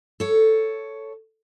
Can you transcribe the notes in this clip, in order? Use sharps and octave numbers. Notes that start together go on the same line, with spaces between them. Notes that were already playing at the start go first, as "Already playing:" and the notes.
A4 C#5